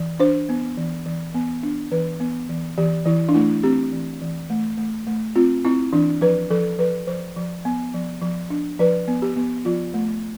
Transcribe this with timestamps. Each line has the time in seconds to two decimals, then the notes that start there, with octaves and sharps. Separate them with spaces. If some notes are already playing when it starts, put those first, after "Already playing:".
Already playing: E3
0.20 D4 C5
0.49 B3
0.78 E3
1.06 E3
1.35 B3
1.63 D4
1.92 E3 B4
2.20 B3
2.49 E3
2.78 E3 G4
3.06 E3 E4
3.29 D4
3.34 A3 E4
3.63 C4 G4
3.93 E3
4.22 E3
4.50 A3
4.78 A3
5.07 A3
5.36 C4 F4
5.65 C4 E4
5.93 E3 D4
6.21 F3 B4
6.50 F3 A4
6.79 F3 B4
7.07 F3 C5
7.36 F3
7.65 B3
7.94 F3
8.22 F3
8.50 D4
8.79 F3 B4
9.08 B3
9.22 G4
9.36 B3
9.65 F3 F4
9.94 A3